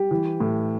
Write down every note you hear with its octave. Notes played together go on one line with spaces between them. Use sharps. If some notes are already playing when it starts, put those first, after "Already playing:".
Already playing: G3 G4
E3
A2